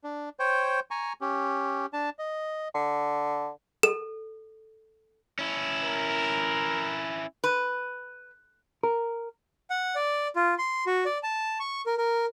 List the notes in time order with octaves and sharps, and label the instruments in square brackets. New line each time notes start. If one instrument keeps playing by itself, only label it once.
[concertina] D4
C5 C#5 G5
G#5 A#5 C#6
C#4 G4
D4 A5
D#5
[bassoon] D3
[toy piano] A4 [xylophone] E7
[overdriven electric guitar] C#4 E4
[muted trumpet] A#4
[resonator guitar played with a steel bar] B4
[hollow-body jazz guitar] A#4
[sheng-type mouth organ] F#5
D5
F4
C6
F#4
D5
A5
C#6
A#4
A#4